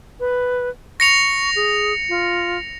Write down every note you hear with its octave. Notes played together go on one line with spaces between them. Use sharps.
B4
C#6 A#6 C#7 F7
G#4
F4